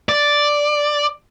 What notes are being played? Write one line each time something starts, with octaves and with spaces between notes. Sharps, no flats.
D5